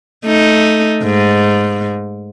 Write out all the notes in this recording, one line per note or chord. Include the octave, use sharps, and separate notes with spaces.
A3 D#4
G#2